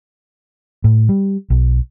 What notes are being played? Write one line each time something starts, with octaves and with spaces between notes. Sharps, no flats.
A2
G3
B1